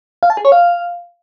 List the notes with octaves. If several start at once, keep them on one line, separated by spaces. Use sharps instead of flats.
F5
A5
G#4
C#5
F5